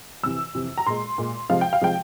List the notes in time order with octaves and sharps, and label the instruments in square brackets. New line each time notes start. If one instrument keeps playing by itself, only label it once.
[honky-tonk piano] F2 C3 E3 E6
F2 C3 E3
A#5
A#2 G#3 C6
A#2 G#3
C3 F3 G#3 F5
G5
F5
C3 F3 G#3 G5